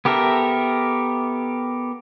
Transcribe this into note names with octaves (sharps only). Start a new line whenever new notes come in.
B3 G4 A4 A#4 E5